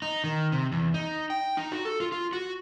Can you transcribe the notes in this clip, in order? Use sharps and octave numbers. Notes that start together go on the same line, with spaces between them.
D#4
D#3
C3
E2
D#4
G5
D#4
F#4
A4
F4
F4
F#4